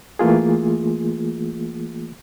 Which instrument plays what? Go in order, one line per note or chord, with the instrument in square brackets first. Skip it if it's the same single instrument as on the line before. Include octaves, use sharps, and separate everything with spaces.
[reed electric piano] E3 A3 A#3 F4 G#4